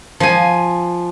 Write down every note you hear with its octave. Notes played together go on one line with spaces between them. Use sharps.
F3 G#5